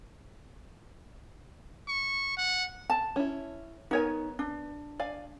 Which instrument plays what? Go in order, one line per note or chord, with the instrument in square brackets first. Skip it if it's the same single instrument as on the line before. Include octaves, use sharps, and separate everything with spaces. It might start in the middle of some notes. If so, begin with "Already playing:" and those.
[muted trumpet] C#6
F#5
[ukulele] A5
[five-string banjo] C#4 E4
[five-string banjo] B3 A#4 G#5 [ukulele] D#4 C#5
[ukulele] D4
[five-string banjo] D5 F5 G#5